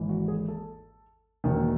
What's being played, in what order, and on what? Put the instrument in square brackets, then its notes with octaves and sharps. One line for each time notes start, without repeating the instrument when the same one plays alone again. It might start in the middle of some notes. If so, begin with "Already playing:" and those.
Already playing: [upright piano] G#1 G#2 E3
F#4
G#4
A4
E1 D#2 D#3